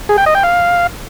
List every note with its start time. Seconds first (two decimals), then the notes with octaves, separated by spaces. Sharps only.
0.09 G#4
0.18 G5
0.26 D#5
0.35 G5
0.43 F5